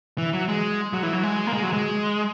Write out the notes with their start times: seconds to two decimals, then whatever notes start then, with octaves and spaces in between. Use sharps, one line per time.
0.18 E3
0.33 F#3
0.49 G#3
0.93 F#3
1.03 E3
1.13 F#3
1.23 G#3
1.47 A#3
1.53 G#3
1.63 F#3
1.73 G#3